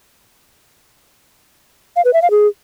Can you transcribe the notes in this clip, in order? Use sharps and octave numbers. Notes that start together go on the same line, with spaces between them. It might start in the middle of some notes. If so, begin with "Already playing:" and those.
F5
B4
E5
F5
G#4